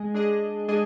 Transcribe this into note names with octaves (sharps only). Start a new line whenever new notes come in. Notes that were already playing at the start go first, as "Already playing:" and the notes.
Already playing: G#3 G#4 D#5
G#3 D4 G#4 D#5
G#3 D4 G#4 D#5